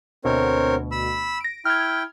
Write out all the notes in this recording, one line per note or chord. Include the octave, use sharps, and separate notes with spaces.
D2 B2 C4 A#4 C#5
B5 E6
A#6 D7
E4 G5 F6 G#6